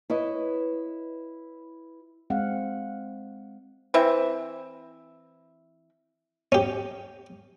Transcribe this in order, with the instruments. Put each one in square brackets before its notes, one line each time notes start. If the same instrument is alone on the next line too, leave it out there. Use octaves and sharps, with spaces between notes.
[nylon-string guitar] E4 B4 C#5 D#5
[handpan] G#3 C4 F5 F#5
[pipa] E3 C4 E5
[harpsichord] C#4 G4